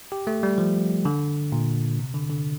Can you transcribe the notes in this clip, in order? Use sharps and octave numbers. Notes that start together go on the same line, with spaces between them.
G4
A3
G3
F3
D3
A#2
C3
D3
D3